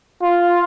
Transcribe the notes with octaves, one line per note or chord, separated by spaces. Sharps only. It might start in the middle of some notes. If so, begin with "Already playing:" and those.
F4